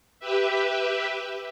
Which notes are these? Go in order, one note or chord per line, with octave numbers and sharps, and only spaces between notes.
G4 B4 E5